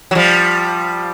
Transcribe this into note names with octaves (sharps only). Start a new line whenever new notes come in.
F#3
F3 G3